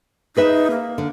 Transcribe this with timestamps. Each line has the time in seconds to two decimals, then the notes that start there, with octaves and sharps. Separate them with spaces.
0.36 D#4 G#4 B4 E5
0.71 A#3
0.98 D3